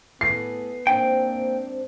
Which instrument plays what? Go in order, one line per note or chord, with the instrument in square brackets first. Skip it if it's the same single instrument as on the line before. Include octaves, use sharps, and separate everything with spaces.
[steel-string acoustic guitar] A2 G#4 A4 [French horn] B3 [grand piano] C7
[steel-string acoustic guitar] G#2 C4 D4 [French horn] A#3 [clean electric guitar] G5